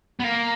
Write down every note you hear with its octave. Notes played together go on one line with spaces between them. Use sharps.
B3
A#3